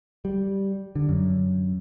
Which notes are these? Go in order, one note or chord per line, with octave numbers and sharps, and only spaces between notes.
G3
D3
F#2